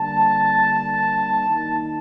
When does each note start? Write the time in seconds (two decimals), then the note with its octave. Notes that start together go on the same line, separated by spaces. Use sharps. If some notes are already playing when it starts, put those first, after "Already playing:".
Already playing: D3 G3 A#3 D4 A5
1.46 D#3 A#3 D#4